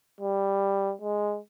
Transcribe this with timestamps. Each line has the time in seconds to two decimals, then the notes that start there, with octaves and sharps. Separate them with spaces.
0.21 G3
1.02 G#3